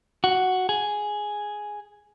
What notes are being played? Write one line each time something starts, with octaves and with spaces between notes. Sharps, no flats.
F#4
G#4